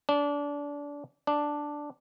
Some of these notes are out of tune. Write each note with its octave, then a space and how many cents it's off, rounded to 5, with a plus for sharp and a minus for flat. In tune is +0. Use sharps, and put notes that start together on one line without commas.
D4 -25
D4 +0